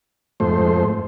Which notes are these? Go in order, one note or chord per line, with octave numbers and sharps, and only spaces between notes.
F2 G#2 A3 C5